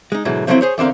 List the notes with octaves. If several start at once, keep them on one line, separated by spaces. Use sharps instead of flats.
G#3 D#4
G#2 B2 D3 E3 F#3
F3 F#3 A3 A#3 C4 E4
G#4 C5 C#5
E2 D3 C4 A#4 F5